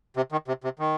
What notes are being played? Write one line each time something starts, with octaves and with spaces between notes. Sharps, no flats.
C3
D#3
C3
C3
D#3